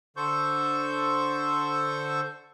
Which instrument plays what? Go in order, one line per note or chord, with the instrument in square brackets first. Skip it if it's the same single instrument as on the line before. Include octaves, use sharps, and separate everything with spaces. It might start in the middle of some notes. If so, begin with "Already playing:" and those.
[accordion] D3 A4 C5 C#6 G6